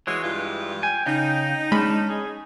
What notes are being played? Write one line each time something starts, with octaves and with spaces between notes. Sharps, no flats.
E3 G#3 F#4 G#4 C#5
G2 F4
G5 G#5
C#3 D#4
G#3 C#4 D4 B5
G#4